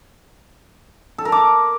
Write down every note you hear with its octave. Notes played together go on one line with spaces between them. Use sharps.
A4
A#4
D6